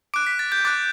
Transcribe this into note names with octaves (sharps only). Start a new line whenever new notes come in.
D6 F#6 D7
B6
A6
G6
D6 F#6 A6